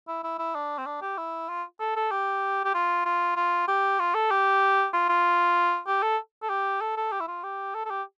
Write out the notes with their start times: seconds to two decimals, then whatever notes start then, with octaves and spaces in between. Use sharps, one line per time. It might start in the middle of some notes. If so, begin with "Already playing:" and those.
0.08 E4
0.24 E4
0.39 E4
0.55 D4
0.78 C4
0.86 D4
1.01 G4
1.18 E4
1.49 F4
1.80 A4
1.96 A4
2.12 G4
2.65 G4
2.74 F4
3.05 F4
3.36 F4
3.68 G4
3.99 F4
4.15 A4
4.31 G4
4.93 F4
5.09 F4
5.87 G4
6.03 A4
6.42 A4
6.50 G4
6.81 A4
6.97 A4
7.12 G4
7.21 E4
7.28 F4
7.44 G4
7.75 A4
7.86 A4
7.91 G4